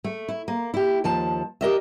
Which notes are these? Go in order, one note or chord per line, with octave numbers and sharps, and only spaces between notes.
A3
E4
A#3
E4 G4
D#2 F3 A5
G4 A#4 D#5 E5